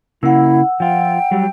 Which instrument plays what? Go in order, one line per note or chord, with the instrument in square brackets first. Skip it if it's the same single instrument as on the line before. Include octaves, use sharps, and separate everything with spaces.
[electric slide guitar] C#3 A#3 [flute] E4 [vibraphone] F#5 E6
[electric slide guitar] F3 F4 [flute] G5
[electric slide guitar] F#3 G3